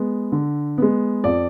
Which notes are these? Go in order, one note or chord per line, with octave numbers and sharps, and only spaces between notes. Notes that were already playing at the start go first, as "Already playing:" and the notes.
Already playing: G#3 B3
D3
G#3 B3
F2 D5